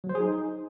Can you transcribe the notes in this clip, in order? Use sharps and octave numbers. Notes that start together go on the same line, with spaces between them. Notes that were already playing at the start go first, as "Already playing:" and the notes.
F#3
C5
G#4
D#4